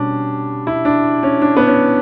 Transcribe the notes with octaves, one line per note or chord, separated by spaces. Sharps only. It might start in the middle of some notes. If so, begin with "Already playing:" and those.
Already playing: B2 G3 C#4 D4
E4
D4
C#4
D4
B3
C#4